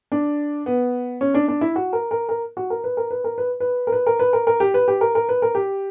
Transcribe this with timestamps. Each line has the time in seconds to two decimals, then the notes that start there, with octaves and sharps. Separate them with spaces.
0.12 D4
0.66 B3
1.21 C#4
1.34 D4
1.48 D4
1.61 E4
1.76 F#4
1.93 A#4
2.11 A#4
2.29 A#4
2.57 F#4
2.70 A#4
2.84 B4
2.97 A#4
3.11 B4
3.24 A#4
3.38 B4
3.60 B4
3.87 A#4
3.92 B4
4.07 A#4
4.19 B4
4.33 A#4
4.47 A#4
4.60 G4
4.74 B4
4.88 G4
5.01 A#4
5.15 A#4
5.29 B4
5.42 A#4
5.55 G4